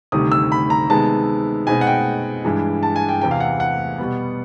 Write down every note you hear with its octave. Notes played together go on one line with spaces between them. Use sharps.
D2 C3 D#3 G3 D#6
E6
B5
A#5
C3 D#3 G#3 B3 A5
B2 G#3 C4 D#4 G#5
F#5
G5
G2 E3 G#3
A5
G#5
G5
E2 C3 E3 G5
F5
F#5
F#5
B2 G3 B3